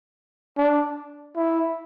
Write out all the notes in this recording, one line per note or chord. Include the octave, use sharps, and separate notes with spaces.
D4
E4